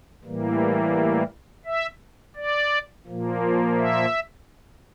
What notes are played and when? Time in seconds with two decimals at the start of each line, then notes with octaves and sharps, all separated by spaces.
0.24 A2 E3 G3 A#3
1.65 E5
2.36 D5
3.07 A#2 F3 A#3
3.77 E5